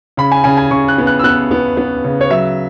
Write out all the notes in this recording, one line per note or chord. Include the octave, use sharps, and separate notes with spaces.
C#3 B5
G#5
C#3 G#5
G#5
C#3 C#6
F#6
B3
F#6
E6
B3 F#6
B3
B3
C#3
C#5
F#3 E5